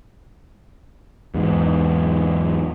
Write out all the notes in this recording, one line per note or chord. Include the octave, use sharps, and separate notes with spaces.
E2 G#2